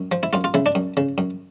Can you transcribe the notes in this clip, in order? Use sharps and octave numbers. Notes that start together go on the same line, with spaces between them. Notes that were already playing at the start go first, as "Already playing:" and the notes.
Already playing: F#2
F3
E4
F#2 F4
F4
C#3 E4
D4
F#2
C#3
F#2